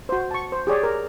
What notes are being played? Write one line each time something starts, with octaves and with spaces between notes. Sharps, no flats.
F#4 C5
A5 C#6
C5
G4 G#4 C#5 D5
A#4